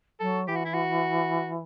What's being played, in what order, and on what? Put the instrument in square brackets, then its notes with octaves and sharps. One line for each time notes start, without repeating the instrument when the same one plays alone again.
[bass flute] F#3 [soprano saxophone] A4
[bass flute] E3 [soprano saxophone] G4
[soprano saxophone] F#4
E4
F#4